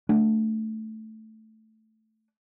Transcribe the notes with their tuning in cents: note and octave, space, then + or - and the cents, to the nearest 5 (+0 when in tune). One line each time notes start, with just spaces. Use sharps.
A3 +0 D4 +0